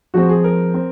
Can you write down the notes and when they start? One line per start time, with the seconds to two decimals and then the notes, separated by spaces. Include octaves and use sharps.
0.14 F3 G#3 C4 F#4
0.29 G#4
0.44 A#4
0.74 C4